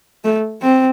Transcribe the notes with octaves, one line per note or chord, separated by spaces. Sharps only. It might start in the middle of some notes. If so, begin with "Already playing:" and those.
A3
C4